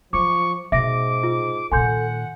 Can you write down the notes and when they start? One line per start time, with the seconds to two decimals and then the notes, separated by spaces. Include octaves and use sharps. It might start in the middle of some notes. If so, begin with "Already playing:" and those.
0.13 F3 F#3 C#6 D6
0.72 G#2 B2 E5 D6 A#6
1.23 F4
1.72 A#2 D#3 A4 F#5 G#5 C6 G6